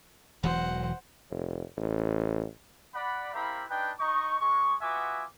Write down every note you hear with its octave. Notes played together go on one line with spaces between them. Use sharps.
E1 E3 F#3 C5 F#5
F1
A1
D5 F#5 B5
C4 E4 G4 A#4 F5 B5
D4 D#4 B4 G5
D#4 C#6
G#3 C#6
B3 F4 F#4 E5 G#5 D6